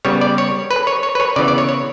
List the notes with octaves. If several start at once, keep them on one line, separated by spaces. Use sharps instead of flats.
C#3 G3 B3 C#5
D5
C#5
B4
C#5
C#5
B4
C#5
C#3 E3 B3 D5
D5
C#5
C#5